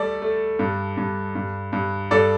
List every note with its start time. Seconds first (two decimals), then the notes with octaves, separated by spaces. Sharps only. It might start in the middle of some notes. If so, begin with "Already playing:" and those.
Already playing: G3 A3 A4 D5
0.22 A3
0.59 G2
0.97 G2
1.35 G2
1.73 G2
2.11 G2 A4 D5